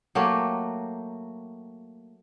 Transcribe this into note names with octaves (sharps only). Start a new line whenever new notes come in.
F#3 A3 A#3 G4